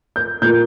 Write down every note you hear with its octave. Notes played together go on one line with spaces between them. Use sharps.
G6
A#2 A#3 G6